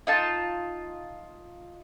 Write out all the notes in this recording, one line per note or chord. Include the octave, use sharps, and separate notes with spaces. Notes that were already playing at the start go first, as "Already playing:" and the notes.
D#4 F4 A5